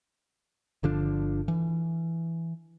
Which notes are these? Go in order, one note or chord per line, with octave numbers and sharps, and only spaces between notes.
G1 D3 F3 D4
E3